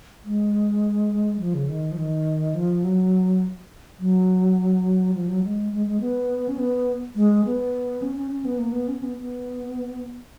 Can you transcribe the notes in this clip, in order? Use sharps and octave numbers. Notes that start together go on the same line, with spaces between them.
G#3
F3
C#3
D#3
F3
D#3
F3
F#3
F#3
F3
F#3
G#3
G#3
G#3
B3
C#4
B3
G#3
B3
C#4
C#4
C#4
B3
A#3
B3
C#4
B3
B3